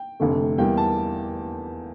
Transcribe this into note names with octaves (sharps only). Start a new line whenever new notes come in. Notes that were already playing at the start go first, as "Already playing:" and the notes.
Already playing: G5
F1 F2 D3 A3
E2 E3 G3 A#3 G5
A5